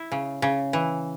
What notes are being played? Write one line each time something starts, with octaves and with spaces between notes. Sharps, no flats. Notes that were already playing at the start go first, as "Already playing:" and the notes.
Already playing: E4
C#3
C#3
E3